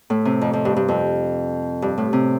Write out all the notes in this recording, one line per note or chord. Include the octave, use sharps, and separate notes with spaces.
A2
C3
F2
F2
G2
G2
F2
G2
A2
C3